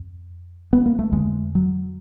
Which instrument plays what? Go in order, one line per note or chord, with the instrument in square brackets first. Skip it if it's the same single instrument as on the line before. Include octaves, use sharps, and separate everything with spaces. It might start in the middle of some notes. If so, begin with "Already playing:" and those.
Already playing: [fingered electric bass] F2
B3
A#3
A3
F2 D3 G#3
F#3